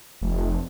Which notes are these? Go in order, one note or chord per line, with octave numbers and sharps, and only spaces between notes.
F1